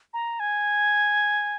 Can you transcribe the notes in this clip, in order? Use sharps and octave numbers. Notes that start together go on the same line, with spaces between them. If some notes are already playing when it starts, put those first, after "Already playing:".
A#5
G#5